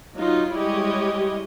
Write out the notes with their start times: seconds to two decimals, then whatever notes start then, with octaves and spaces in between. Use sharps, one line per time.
0.16 F#3 D#4 F4
0.53 G3 G#3 E4 G4 C#5 D#5